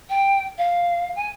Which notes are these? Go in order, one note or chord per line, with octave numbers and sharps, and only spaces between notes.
G5
F5
G#5